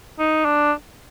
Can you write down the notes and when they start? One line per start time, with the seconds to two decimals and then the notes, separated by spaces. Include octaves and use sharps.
0.19 D#4
0.45 D4